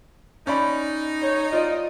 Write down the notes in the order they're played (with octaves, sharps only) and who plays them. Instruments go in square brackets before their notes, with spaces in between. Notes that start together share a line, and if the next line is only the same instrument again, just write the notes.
[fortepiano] C#4 D5 B5 [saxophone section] D#4
[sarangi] C#5
[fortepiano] F4 D5 [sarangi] D#5